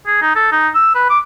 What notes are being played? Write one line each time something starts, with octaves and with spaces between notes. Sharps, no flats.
G#4
D#4
A4
D#4
E6
B4
D6